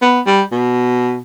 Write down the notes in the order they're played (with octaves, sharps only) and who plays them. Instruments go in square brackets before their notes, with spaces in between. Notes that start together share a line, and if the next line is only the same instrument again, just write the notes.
[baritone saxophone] B3
G3
B2